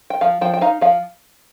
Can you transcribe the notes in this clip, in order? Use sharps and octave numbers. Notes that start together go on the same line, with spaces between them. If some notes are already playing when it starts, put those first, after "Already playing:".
G5
F3 F5
F3 G5
G5
D#4 F5
F3 F5